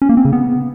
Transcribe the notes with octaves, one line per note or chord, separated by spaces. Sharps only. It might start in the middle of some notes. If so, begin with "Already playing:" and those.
C#4
A#3
C4
C#3
B3